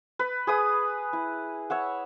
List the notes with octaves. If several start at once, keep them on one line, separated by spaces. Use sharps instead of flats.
B4
G#4 B4 D#6
E4
C#5 E5 F#5